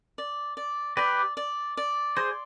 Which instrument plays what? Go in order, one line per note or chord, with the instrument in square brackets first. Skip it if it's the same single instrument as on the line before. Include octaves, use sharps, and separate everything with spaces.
[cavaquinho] D5
D5
[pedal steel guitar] G4 B4 [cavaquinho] D5
[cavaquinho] D5
D5
[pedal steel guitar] G#4 C5 [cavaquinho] C6